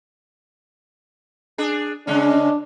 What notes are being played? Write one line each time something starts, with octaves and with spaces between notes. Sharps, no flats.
D4 G#4
C#3 G#3 C#4 D4